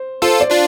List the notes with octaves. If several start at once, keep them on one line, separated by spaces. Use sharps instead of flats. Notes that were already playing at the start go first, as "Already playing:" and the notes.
Already playing: C5
F4 A4 C5
D5
D4 F4